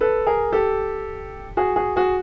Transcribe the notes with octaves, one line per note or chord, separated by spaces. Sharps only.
A4 B4
G#4 A#4
G4 A4
F#4 G#4
F#4 G#4
F#4 G#4